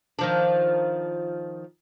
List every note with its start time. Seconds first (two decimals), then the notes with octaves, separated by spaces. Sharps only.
0.19 D#3 F3 D4